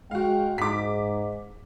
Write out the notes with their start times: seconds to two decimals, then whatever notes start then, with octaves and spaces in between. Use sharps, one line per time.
0.11 G#3 F#4 F5 G5
0.58 G#2 D6 B6